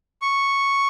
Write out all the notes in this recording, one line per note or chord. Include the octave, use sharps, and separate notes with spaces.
C#6